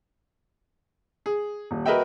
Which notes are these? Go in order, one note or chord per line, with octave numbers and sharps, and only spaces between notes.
G#4
D#1
F#4 A#4 B4 D#5 E5 G5